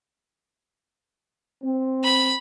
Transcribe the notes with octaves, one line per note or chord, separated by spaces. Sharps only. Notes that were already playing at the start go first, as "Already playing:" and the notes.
C4
B5